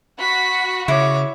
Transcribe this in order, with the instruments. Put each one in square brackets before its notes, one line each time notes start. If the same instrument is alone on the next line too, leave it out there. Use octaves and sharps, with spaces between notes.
[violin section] F#4 [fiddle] F#5 B5
[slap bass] C#3 [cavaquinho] E4 [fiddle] C#5 D6